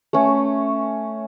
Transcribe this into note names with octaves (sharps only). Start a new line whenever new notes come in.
A3 C#4